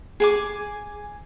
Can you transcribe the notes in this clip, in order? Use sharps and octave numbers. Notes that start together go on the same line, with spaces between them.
G#4 G#5 D6